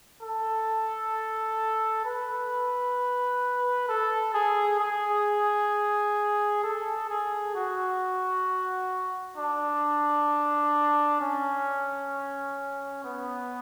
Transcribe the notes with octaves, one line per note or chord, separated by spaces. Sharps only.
A4
B4
A4
G#4
G#4
A4
G#4
F#4
D4
C#4
B3